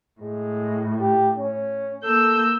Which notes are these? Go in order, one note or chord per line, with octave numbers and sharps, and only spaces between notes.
A2 G#3
G4
C#4
A#3 A4 E6 G6